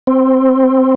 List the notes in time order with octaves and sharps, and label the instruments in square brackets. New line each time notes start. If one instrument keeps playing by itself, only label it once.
[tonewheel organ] C4